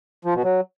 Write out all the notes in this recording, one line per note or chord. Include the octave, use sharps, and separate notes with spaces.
F3
B2
F#3